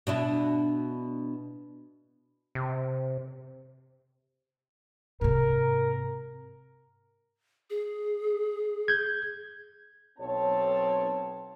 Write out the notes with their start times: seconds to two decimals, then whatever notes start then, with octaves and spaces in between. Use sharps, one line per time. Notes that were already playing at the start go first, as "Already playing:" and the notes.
0.07 B2 D4 E4
2.55 C3
5.21 G#2 C3 A#4
7.70 G#4
8.88 G6 G#6
10.19 B1 C4 C#5 A5